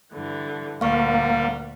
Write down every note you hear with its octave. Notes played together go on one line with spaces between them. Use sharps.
G2 D3 E3
D2 A#2 G3 A#3 F5 F#5 C#6